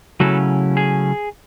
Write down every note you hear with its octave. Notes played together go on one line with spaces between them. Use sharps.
C#3 F#3 A3 C#4 E4 F#4 A4
G#4